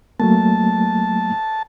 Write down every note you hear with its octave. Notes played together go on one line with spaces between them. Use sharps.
F#3 A3 A#3 A5